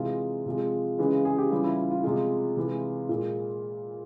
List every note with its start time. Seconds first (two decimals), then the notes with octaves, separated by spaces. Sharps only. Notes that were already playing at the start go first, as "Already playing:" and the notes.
Already playing: C3 E3 G#3 F4
0.46 C3 F3 G#3
0.99 C#3 E3 G#3
1.25 G#4
1.38 G4
1.51 C#3 E3 G3 F4
1.64 E4
1.77 F4
1.91 F4
2.04 C3 F3 G#3 F4
2.57 C3 E3 G#3
3.09 A#2 G#3